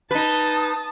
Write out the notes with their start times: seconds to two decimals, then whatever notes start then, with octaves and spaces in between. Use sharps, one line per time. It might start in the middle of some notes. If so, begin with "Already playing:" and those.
0.11 D#4 B4 A5 D#6